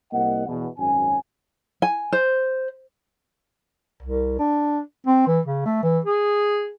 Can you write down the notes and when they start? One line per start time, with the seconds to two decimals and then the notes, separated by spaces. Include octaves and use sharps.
0.12 C2 A#3 D#5 F#5
0.48 E2 B2
0.78 G#1 F#2 C#4 G#5
1.82 G#5
2.12 C5
4.03 C2
4.39 D4
5.07 C4
5.27 E3
5.46 C#3
5.66 A3
5.83 E3
6.04 G#4